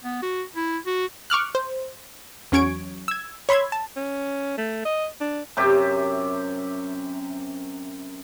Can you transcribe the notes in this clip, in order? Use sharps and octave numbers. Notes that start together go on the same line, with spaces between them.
B3
F#4
E4
F#4
C#6 D6 F6 F#6
C5
E2 F#3 C#4 C#6 G#6 D7
E6 G#6
C#5 B5 C6 E6 G#6
A5
C#4
A3
D#5
D4
F#2 C3 G4 E5